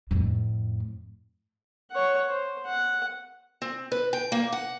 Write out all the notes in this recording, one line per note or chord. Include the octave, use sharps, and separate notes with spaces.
F2 A2
C#5 F#5
C5
F#5
C4
B4
G5
A#3
F#5